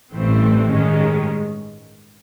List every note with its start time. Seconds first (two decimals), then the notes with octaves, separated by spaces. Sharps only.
0.13 A1 G2 E3 A3 C4
0.70 G2 D#3 G#3 C#4